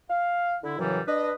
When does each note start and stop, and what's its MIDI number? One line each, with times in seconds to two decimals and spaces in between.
0.10 0.56 77
0.63 0.76 50
0.63 0.76 64
0.79 1.00 42
0.79 1.00 45
0.79 1.00 49
0.79 1.00 52
0.79 1.00 54
0.79 1.00 55
1.07 1.32 62
1.07 1.32 71
1.07 1.32 75